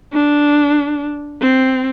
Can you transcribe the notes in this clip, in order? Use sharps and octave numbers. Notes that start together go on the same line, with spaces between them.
D4
C4